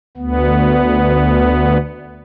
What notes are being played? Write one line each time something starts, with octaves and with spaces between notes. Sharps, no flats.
D2 B3